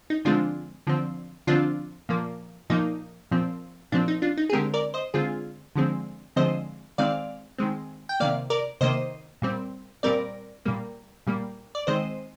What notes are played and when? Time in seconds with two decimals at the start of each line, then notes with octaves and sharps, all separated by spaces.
0.10 D#4
0.25 D3 F3 G#3 C4 D4 F4
0.87 D3 F3 C4
1.47 D3 F3 C4 D4 F4
2.09 A#2 F3 A#3
2.70 A#2 F3 A#3 D#4
3.31 A#2 F3 C4
3.92 A#2 F3 C4 D4
4.08 D#4
4.22 D4 F4
4.37 D#4
4.50 G#4
4.53 D3 G#3 C4 G4 A#4
4.74 A#4 D5
4.94 C5 D#5
5.14 D3 G#3 C4 F4 G#4
5.76 D3 F3 G#3 C4
6.36 D3 F3 G#3 C4 C5 D#5
6.98 D#3 G#3 C4 D5 F5
7.58 D#3 G#3 C4
8.09 G5
8.20 C3 D#3 A#3 D5 F5
8.50 A#4 D5
8.81 C3 D#3 A#3 C5 D#5
9.42 A#2 G3 C4
10.03 A#2 G3 C4 A#4 D5
10.65 A#2 G3 A#3
11.27 A#2 G3 A#3
11.75 D5
11.87 D#3 G#3 C4 C5 D#5